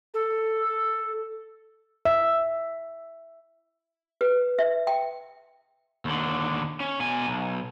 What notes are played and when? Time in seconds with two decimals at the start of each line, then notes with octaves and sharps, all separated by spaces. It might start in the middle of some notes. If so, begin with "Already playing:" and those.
0.14 A4
2.05 E5
4.21 B4
4.59 E5
4.87 G5
6.05 D#2 D3
6.80 C#4
7.00 B2 G#5
7.28 B1